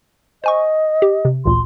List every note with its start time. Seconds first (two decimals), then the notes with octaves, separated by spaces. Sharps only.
0.44 C5 D#5 G#5 C#6
1.02 G4
1.25 C3
1.45 A1 D2 A#2 C6